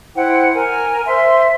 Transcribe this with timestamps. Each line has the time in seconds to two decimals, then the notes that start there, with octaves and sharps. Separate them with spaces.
0.15 E4 C5 F#5 G5
0.53 A#4 G#5
1.06 C5 E5 C6